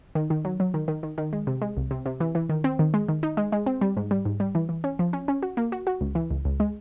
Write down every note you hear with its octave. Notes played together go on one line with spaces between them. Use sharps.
D#3
D#3
F#3
F#3
D#3
D#3
D#3
D#3
G#3
C3
G#3
C2
C3
C3
E3
E3
D#3
C4
D#3
G#3
D#3
D#4
G#3
G#3
C4
G3
G#2
G3
G#2
G3
E3
E3
C#4
F3
C#4
C#4
F#4
A#3
F#4
F#4
C#2
E3
C#2
C#2
G#3